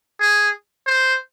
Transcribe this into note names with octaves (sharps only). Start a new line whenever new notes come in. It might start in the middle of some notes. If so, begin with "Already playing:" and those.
G#4
C5